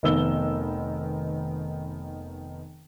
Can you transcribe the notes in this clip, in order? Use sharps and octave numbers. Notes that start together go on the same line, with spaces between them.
F1 D#3 B3 E6 G7